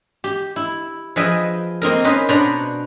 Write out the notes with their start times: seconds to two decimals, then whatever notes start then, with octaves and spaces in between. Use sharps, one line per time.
0.24 G4
0.56 E4
1.16 F3 G#4 B4 D#5 E5 G5
1.82 A#3 C4 D#4 A#4
2.04 C#4 B4 C5 D#5
2.29 B2 D4 B4 C5 F#5 A#5